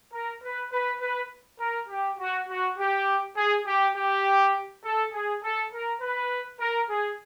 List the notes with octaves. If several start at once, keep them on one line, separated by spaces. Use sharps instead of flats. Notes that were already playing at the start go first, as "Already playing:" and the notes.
A#4
B4
B4
B4
A#4
G4
F#4
F#4
G4
G#4
G4
G4
A4
G#4
A4
A#4
B4
A#4
G#4